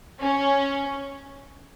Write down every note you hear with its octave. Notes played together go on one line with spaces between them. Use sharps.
C#4